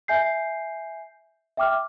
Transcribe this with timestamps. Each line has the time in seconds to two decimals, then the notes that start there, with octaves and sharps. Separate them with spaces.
0.08 E5 G#5 G6 C7
1.57 E5 G5 D6 F6